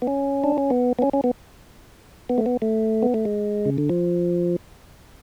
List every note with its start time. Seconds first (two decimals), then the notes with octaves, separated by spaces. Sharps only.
0.02 B3
0.07 C#4
0.44 D4
0.58 C#4
0.70 B3
0.99 B3
1.02 C#4
1.13 C#4
1.24 B3
2.29 B3
2.38 A3
2.46 B3
2.62 A3
3.03 B3
3.14 A3
3.25 G#3
3.66 C#3
3.78 D3
3.89 F3